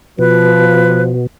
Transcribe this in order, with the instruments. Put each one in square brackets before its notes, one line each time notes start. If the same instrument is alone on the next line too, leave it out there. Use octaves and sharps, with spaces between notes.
[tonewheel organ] B2 [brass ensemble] F3 [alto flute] B4